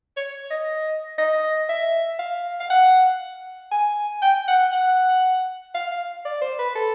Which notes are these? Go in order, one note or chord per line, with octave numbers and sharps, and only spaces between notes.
C#5
D#5
D#5
E5
F5
F5
F#5
G#5
G5
F#5
F#5
F5
F5
D5
C5
B4
A4